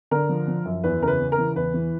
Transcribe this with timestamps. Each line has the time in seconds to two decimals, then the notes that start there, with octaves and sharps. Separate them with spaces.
0.11 D3 A#4
0.29 F3
0.48 F3
0.65 F#2
0.84 E2 B4
1.02 C#3 A#4
1.08 B4
1.20 C#3
1.32 A#4
1.38 E3
1.56 E2 B4
1.74 E3